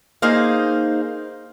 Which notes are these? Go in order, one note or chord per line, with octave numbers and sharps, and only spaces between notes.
A#3 D#4 G#4 C5 F5